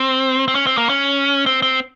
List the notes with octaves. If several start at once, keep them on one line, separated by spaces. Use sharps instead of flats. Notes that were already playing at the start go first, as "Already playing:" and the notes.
Already playing: C4
C4
C#4
C4
A#3
C#4
C4
C4